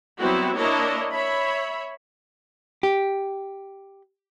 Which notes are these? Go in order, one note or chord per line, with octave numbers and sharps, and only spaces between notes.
F#3 G3 B3 C4 E4 F#4
A#3 D4 E4 A#4 C#5 D#5
C#5 E5 B5
G4